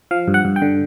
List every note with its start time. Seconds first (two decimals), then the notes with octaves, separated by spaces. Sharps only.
0.11 F3 F5
0.28 G2
0.34 F#5
0.45 G2
0.56 G5
0.62 D3